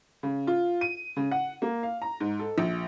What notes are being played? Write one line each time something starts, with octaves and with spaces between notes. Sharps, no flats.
C#3
F4
D#7
C#3
F#5
A#3
F5
A#5
G#2
A4
A#1